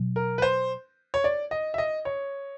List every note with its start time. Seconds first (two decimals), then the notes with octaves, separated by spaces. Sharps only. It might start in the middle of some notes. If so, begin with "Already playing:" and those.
Already playing: B2 F#3
0.16 A#4
0.38 B4
0.42 C5
1.14 C#5
1.24 D5
1.51 D#5
1.74 E5
1.78 D#5
2.05 C#5